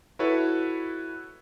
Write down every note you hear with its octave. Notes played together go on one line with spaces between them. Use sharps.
E4 F#4 A4 B4 C#5